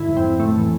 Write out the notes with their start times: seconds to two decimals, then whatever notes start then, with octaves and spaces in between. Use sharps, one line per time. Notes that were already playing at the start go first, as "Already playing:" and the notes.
Already playing: G#2 D3 E4
0.09 F2
0.17 C4
0.24 F2
0.40 A2 A3
0.56 E3